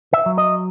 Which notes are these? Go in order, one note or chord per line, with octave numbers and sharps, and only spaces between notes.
E5
F#3
D#5